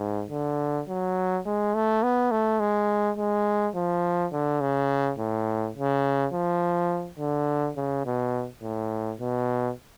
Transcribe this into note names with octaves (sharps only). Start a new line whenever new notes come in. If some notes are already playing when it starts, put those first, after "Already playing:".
Already playing: G#2
D3
F#3
G#3
A3
B3
A3
G#3
G#3
F3
D3
C#3
A2
C#3
F3
D3
C#3
B2
A2
B2